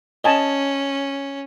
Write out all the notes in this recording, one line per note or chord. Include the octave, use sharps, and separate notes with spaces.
C#4 D#5 G#5 A5